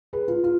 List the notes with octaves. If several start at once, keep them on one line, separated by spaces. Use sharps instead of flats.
G#4 B4
F4
F4